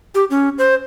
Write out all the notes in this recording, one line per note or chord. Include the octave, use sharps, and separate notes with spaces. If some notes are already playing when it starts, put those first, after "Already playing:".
G4
C#4
C5